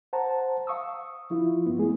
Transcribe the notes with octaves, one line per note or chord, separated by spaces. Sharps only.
C5 F#5 A5 A#5
F5 C#6 D#6 E6
F3 E4 F4
G2 B3
G#3 A3 B3 C4 E4 G#4